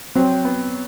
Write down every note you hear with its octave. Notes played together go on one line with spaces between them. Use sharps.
F#3 C4
B3